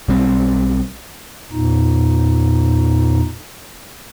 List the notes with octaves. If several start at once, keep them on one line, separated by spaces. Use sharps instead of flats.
B1 G3 C4
E2 A#2 D#4